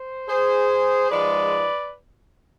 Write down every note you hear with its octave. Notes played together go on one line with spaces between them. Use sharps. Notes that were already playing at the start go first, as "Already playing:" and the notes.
Already playing: C5
G#4 C5
G#2 F3 G#3 B4 D5